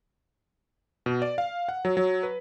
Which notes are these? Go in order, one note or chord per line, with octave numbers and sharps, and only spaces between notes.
B2
D5
F5
F#5
F#3
F#3
B4